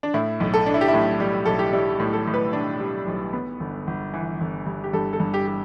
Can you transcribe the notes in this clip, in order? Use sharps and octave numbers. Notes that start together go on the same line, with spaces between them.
D4
A2 E4
B1
A4
D4
E4
G4
E4
A2
G3
B1 A4
G4
G3 E4
A2
A4
A2
B4
D4
G3
B1
B3
G1
G1
E3
G1
G2
G4
G2 A4
A4
G2
G4
G4